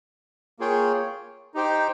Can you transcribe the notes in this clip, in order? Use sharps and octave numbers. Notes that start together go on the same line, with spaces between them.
A#3 F4 G#4 C#5 G5
D#4 G4 C5 G5